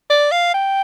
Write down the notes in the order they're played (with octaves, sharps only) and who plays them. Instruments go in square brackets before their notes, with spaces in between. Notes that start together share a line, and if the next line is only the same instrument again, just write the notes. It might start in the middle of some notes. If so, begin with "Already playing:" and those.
[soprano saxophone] D5
F5
G5